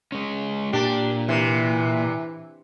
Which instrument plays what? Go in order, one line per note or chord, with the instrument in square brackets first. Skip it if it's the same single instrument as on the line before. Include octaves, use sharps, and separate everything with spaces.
[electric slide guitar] G#3 C#4
[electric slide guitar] A#2 [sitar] D4 [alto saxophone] G4
[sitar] C3 [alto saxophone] E3